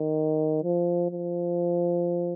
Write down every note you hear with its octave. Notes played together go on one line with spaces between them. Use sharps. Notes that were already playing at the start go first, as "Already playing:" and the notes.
Already playing: D#3
F3
F3